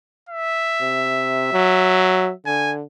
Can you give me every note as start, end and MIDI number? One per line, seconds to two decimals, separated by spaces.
0.29 2.33 76
0.81 1.50 48
1.53 2.31 54
2.46 2.83 50
2.46 2.73 80